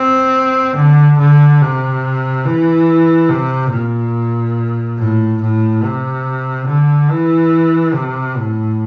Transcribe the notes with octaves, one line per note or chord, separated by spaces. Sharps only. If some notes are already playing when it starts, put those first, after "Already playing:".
Already playing: C4
D3
D3
C3
E3
C3
A#2
A2
A2
C3
D3
E3
C3
A2